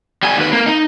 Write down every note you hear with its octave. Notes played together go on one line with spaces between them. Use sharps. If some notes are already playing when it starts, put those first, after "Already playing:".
G3 G#5
D#2 B4
A#3
D#4